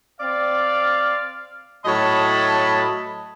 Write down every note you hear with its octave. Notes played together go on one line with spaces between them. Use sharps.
C4 D5 F5
A2 F#3 C#5 D#5 A5 B5